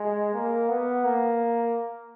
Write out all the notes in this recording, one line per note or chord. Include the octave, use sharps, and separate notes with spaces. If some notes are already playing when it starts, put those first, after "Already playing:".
Already playing: G#3
A#3
B3
A#3